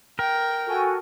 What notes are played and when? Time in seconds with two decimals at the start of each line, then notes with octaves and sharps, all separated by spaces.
0.19 A#4 G5
0.67 F#4 A4 G#5